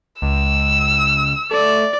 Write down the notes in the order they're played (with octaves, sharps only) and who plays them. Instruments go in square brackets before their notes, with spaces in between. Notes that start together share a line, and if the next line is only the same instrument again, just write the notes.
[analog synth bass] C#2 [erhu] E6
[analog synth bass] A3 [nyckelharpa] D5